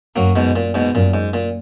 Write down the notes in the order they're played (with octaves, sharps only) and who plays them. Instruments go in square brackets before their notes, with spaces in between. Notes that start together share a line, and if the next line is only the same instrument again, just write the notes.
[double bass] F#2 [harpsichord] F#3 A#3
[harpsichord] G#2 B2
A#2
G#2 B2
[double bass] F#2 [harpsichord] A#2
[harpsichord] G#2
A#2